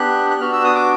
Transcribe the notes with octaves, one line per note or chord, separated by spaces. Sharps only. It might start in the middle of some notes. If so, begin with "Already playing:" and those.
Already playing: B3 D4 G4 F#6
F#6
B3 D4 F#4 F6
E6
D#6
D6